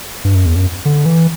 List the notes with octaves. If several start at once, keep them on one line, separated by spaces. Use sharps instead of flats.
G2
F#2
E2
F#2
D3
E3